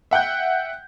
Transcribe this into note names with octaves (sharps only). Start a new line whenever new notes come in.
E5 F#5 G5 G6